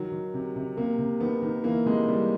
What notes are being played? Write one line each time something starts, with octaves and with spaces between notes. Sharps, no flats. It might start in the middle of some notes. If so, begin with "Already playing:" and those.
Already playing: D#3 F#3
D#3
C3
C3
C3 A#3
C3
D#3 B3
D#3
E3 A#3
C3 G#3
C3 G3